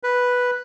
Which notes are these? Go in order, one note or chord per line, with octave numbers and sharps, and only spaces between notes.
B4